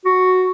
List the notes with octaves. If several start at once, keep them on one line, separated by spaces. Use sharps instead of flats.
F#4